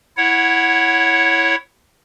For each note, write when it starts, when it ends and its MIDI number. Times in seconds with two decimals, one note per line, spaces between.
0.17 1.55 64
0.17 1.55 73
0.17 1.55 78